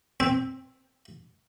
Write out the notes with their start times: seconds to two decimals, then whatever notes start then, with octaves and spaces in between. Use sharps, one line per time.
0.20 C4